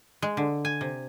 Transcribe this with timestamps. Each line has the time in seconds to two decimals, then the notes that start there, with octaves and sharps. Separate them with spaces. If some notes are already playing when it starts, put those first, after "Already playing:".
0.22 G#3
0.37 D3
0.65 G#5
0.81 C3